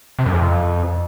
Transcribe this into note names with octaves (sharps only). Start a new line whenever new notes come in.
C3
F#2
F2